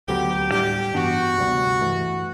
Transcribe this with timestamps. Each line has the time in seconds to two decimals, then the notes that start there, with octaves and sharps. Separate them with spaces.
0.08 D2 D3 F#3 B3 G4
0.51 A2 G3 D4 G4
0.94 G2 E3 B3 D4 F#4
1.38 D2 C3 G3 B3
1.80 G2 E3 A3